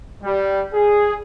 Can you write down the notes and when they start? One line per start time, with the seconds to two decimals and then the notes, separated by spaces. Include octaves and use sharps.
0.23 G3
0.74 G#4